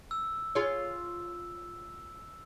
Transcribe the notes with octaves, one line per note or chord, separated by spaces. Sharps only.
E6
F4 G#4 C#5